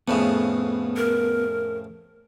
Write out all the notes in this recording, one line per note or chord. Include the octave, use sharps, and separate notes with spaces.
F2 A2 C#3 B3
A#4